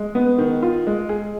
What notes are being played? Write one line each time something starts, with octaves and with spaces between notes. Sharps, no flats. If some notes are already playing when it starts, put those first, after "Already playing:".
Already playing: G#3
B3
D#3
F4
G#3
G#4